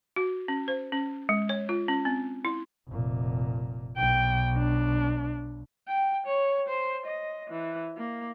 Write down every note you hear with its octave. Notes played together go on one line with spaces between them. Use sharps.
F#4
C#4
C5
C#4
G#3
C#5
F4
C#4
C4
E4
F1 A#2
B1 G5
D4
G5
C#5
C5
D#5
E3
A#3